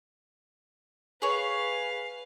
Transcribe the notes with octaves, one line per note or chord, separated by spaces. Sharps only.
G#4 B4 C#5 F5